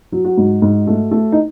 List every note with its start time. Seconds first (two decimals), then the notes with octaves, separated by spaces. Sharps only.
0.12 F#3
0.24 F#4
0.38 G#2
0.62 G#2
0.87 A3
1.11 A3
1.32 D#4